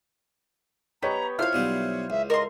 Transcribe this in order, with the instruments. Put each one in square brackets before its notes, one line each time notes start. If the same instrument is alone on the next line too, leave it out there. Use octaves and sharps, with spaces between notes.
[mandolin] B3 [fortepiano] G4 C#5 D#5 [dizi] A#5
[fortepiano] E4 F4 C5 [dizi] C#5 [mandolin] F5 F6
[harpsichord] B1 G3 B3
[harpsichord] C#2 [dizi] E5
[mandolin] A#4 C6 [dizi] D#5